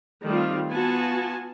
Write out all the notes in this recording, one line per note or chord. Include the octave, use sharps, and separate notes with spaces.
D#3 G3 A3 C4 F4
B3 F4 F#4 G#5 A5